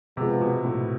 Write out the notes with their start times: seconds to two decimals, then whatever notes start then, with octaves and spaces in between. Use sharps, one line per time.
0.17 C3 F3 G#3 B3 F4 G#4
0.41 B2
0.65 A2